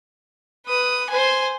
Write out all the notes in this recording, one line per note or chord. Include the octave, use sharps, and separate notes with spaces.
B4 D#6
C5 G#5